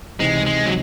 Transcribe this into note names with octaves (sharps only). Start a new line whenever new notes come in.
C#2 C3 E3 G#3 C4 D#4
G#3
F#3